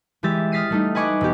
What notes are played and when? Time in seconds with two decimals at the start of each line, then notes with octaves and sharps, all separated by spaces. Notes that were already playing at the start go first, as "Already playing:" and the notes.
0.23 E3 G#3 G4 E5 A6
0.52 D#6 F6 A6 B6 C7 D#7
0.70 G3 A3 D#4
0.95 B4 D#5 G#5 C#6 D6 F#6
1.21 E1 B3 G4